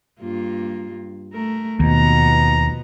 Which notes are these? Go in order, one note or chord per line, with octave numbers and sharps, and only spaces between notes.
G2 A#3 F4
A3 A#4
D#2 B2 F3 B3 A#5